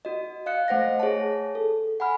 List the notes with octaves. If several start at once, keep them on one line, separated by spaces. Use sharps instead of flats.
F#4 D#5
D#5 F5 F#6 C#7
A3 C5 F#5 A#6
G#4 C#5 A5
A4
F#5 G#5 B5 F6